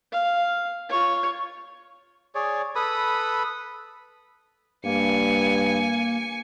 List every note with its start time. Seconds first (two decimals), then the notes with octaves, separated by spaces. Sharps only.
0.12 F5
0.89 F4 C#5
2.35 G#4 C#5 D5
2.75 A4 B4 B5 D#6
4.85 G2 A#3 G#5 C#7